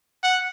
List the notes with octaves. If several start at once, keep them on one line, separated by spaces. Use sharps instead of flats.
F#5